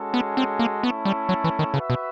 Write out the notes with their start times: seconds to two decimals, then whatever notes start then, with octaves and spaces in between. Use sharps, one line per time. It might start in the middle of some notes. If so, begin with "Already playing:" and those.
Already playing: G#3 C#4 F#4 A4
0.14 B3
0.37 C4
0.59 A#3
0.83 A3 B3 C#4 E4 A4
1.05 G3
1.29 F#3
1.44 E3
1.59 D#3
1.74 C#3 F#4 B4 E5
1.90 B2